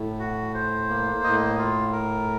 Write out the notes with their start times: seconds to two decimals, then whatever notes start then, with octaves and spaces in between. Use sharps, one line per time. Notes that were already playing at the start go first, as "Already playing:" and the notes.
Already playing: A2
0.20 F#4
0.54 C5
0.88 A#3
1.23 A2 D#5
1.59 F4
1.93 A#4